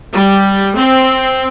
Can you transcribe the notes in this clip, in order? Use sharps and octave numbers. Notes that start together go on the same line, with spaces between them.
G3
C4